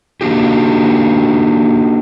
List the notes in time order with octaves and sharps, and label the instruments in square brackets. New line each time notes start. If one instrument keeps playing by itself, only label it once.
[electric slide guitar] A#3 D4 F#4 G4